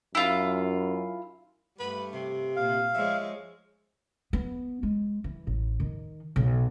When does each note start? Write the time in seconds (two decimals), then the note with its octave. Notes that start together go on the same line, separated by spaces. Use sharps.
0.15 F#2 E4 F4 E6
1.80 G2 A3 B4
2.14 C3
2.56 A#2 F5
2.95 F3 G#3 C#5 E5
4.33 B3
4.83 G#3
5.24 E3
5.47 A1
5.80 D#3
6.36 B1